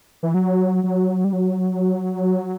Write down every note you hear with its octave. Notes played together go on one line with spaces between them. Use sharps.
E3
F#3
F#3
G3
F#3